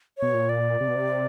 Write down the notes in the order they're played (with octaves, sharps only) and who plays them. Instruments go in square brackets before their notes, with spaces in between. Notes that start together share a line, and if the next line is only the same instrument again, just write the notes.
[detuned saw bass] B2 [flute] C#5
[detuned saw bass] A#2
[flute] D5
[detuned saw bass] C3
B2
C3